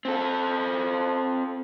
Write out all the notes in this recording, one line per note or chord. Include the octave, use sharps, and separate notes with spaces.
C4 A4